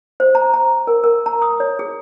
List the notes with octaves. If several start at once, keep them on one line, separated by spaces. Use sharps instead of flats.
C5
A#5
A#5
A#4
A#4
A#5
D#6
C#5
G#4